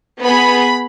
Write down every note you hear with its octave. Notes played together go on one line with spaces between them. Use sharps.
B3 G#4 B5